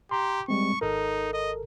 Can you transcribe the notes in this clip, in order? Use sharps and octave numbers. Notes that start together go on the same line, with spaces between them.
G4 A#5 C6
G3 G#3 C4 C#6
G#1 D#4 A4 A#4
D#5